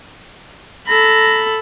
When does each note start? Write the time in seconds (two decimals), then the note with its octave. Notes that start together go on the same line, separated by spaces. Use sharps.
0.88 A4 A#5 B5